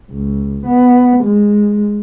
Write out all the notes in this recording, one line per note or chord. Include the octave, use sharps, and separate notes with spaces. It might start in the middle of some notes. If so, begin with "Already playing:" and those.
C#2
B3
G#3